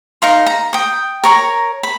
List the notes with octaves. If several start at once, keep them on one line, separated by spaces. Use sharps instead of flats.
D#4 A#4 F5 C6
A#5
G5 D#6
A#4 C#5 A#5
B5